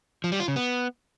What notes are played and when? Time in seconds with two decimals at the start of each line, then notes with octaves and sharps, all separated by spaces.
0.24 F3
0.32 G3
0.40 F4
0.48 C#3
0.56 B3